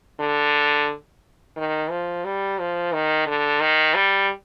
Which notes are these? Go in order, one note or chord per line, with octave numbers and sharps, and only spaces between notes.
D3
D#3
F3
G3
F3
D#3
D3
D#3
G3